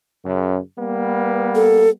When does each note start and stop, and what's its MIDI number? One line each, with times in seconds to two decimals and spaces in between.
0.25 0.59 42
0.25 0.59 49
0.79 1.90 55
0.79 1.90 58
0.79 1.90 59
1.55 1.89 69